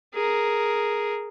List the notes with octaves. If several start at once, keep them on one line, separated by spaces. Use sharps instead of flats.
G#4 A#4